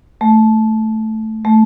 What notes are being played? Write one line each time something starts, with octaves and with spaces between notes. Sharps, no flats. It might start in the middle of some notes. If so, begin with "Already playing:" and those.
A3
A3